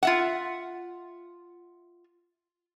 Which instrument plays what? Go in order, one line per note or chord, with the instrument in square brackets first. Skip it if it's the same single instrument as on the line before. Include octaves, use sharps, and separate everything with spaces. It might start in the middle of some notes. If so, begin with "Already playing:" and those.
[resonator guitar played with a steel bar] F4 E5 F#5